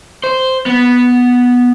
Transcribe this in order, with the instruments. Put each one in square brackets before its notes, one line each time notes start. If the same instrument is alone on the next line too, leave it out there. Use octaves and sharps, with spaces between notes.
[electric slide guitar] C5
B3